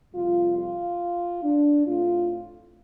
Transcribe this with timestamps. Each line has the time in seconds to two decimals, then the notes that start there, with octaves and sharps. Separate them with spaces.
0.14 F2 C3 G3 F4
0.57 F4
1.43 D4
1.86 A2 A3 C4 F4